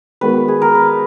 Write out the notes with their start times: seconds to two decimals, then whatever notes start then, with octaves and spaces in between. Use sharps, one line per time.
0.21 D#3 G#3 B3 F#4 B4
0.48 G#4
0.62 A#4
0.75 B4